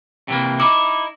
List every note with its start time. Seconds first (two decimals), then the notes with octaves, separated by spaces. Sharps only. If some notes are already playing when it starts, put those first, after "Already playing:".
0.28 C3 E3 A#3
0.60 D#4 E4 D6